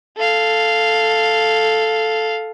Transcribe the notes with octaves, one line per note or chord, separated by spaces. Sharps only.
A4 F5